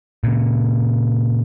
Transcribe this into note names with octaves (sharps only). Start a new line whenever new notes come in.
A#2 C#3